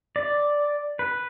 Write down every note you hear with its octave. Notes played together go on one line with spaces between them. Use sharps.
D5
B4